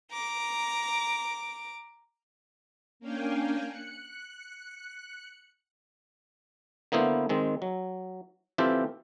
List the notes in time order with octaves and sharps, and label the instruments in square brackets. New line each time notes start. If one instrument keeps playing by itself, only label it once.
[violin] A#5 D6
[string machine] A#3 C#4 D4 F5 G5 G#5
F#6 C#7
[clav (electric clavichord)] D3 A#3 B3 E4 C5
D#3 G#3 C4
F#3
E3 C4 F4 G4 A4